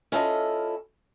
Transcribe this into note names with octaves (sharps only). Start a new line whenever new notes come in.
C#4 E4 F4 A4 A#4 D#5